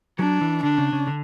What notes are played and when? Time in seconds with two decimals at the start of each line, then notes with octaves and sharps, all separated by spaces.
0.19 F#3 D4
0.41 E3
0.63 D3 D4
0.78 C#3
0.93 C#3
1.07 D3